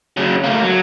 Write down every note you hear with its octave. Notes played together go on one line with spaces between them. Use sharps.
C#3 F#3
A3 A#3
F#3